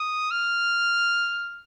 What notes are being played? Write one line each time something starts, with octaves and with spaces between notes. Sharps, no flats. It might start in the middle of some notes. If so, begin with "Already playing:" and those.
Already playing: D#6
F6